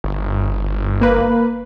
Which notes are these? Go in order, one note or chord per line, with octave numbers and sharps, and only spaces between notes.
G1
A#3 B4